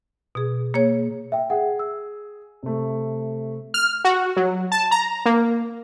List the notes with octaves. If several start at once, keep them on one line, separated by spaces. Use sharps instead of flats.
B2 G#4
A#3 G#4 C#5
E5 G5
G#4 F#5
E6
C3 A3
F6
F#4
F#3
A5
A#5
A#3